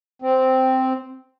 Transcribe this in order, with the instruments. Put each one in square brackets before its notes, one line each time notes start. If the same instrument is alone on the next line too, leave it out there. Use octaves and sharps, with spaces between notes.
[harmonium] C4